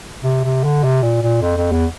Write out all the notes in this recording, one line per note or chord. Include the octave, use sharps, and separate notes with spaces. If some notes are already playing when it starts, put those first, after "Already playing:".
C3
C3
D3
C3
A#2
A#2
F2
F2
E2